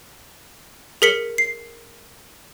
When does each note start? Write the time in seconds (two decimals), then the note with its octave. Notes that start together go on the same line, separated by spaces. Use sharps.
1.02 G#4 A#4 B6 C#7 F#7
1.38 C7